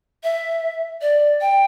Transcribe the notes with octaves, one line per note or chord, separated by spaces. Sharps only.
E5
D5
G5